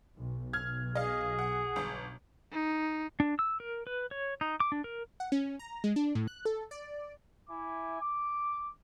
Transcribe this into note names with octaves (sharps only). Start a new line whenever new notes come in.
B1
F6 G#6
G#4 D#5 F5
F#5
G1
D#4
D4
E6
A#4
B4
C#5
D#4
D6
D4
A#4
F#5
C#4
A#5
G#3
D4
A2
F#6
A4
D5
E4 E5 G#5 D6
D6